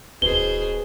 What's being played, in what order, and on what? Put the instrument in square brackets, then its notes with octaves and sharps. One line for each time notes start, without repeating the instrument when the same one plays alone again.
[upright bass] D1 E4 [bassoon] B2 [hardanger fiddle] G#4 C5 [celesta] G7